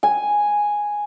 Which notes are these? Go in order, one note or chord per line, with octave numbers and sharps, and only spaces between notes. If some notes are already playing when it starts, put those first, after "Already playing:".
G#5